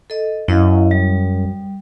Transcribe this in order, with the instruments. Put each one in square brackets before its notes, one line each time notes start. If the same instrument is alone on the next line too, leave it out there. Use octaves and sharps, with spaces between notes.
[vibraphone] A4 D#5
[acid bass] F#2 [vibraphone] E4 D#5 F5
[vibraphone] G3